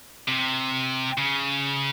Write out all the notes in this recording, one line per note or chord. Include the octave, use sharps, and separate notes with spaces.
C3
C#3